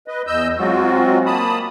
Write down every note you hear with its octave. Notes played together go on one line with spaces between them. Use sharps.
B4 D#5
E2 D#5 E6 G6
F#3 G#3 C4 F4 F#4
A#3 A5 B5 D#6